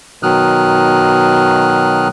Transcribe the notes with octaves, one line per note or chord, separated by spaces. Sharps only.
B2 D#3 F#3 D#6 F6 F#6